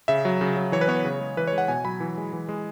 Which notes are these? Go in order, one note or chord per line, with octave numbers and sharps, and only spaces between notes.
C#3 E5
F#3
C#3
F#3
E3 C#5
B4
B3 C#5
C#3
G#3
E3 B4
C#5
G#3
F#5
B2 G#5
F#3 B5
E3
G#3
E3
G#3